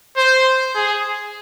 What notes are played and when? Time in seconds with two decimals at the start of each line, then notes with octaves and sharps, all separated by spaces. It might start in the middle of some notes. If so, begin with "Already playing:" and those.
0.17 C5
0.76 G#4